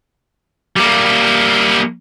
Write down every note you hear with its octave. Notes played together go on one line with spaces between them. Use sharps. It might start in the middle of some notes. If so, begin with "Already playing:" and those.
G3 A#3